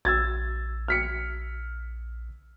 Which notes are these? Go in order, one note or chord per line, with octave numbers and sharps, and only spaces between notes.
A#1 E6 G#6 A6
F6 B6 C#7